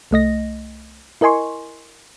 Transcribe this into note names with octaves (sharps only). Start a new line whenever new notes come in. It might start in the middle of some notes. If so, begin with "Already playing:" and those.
C2 A3 D#5 A#6
E4 A#4 D#5 G#5 C6 C#6